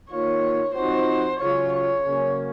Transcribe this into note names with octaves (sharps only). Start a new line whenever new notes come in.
D#3 A#3 F4 C#5
F3 C4 D#4 F#4 C5
C#3 F#3 C#4 F4 C#5
C#5
C#3 F#3 A#3 C#4